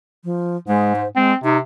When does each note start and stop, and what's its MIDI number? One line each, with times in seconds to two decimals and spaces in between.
0.24 0.56 53
0.68 1.04 44
0.68 0.96 56
0.96 1.08 72
1.16 1.33 56
1.16 1.34 60
1.44 1.58 48
1.44 1.58 63